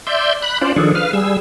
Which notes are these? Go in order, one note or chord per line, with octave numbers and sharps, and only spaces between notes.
D5 E5 C6 G6
B5 F#6
C#4 F4 C5 D5
D#3 F3 D4 G#4 A4
B4 F5 F6
G3 G#4 E6